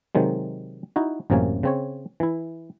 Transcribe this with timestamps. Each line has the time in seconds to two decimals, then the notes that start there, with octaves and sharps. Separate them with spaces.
0.15 C3 D#3 F#3 G#3
0.96 D#4 E4 F#4
1.30 A1 F#2 C3 A#3 C#4 G#5
1.63 C#3 C4 C#5
2.20 E3 E4